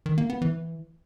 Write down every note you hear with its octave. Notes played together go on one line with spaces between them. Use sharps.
D#3
A#3
B3
E3